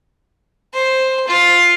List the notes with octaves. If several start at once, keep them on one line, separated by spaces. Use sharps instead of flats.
C5
F4